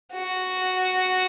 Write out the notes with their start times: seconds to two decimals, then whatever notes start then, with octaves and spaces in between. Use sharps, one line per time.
0.13 F#4